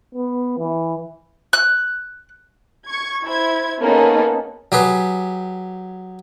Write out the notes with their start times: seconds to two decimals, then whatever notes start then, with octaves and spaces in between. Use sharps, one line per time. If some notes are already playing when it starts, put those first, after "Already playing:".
0.15 B3
0.59 E3
1.53 F#6
2.87 C#6 G#6
3.25 E4 C5 G#6
3.81 A#3 B3 C#4 D#4 G#4 A4
4.72 F#3 G4 G#4 B4